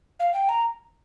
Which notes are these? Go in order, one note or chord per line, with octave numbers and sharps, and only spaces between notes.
F5
G5
A#5